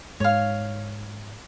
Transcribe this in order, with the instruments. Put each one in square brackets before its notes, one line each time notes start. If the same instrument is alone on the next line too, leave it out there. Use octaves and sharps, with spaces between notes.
[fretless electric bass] G#2 [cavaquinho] C#5 F5